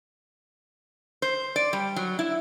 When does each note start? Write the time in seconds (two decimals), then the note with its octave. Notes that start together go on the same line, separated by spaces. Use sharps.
1.22 C5
1.56 D5
1.73 G3
1.96 F#3
2.19 E4